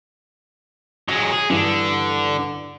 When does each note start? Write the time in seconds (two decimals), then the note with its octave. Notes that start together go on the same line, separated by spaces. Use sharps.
1.09 F#3 G#3 A#6
1.33 G#4
1.50 G2 D3 E3